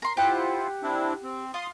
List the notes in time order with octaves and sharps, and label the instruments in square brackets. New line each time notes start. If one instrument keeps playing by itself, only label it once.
[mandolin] A#4 C6
[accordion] E4 F4 C5 [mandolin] G4 F#5
[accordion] C4 D4 E4
C4
[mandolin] F4 [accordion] C6 D#6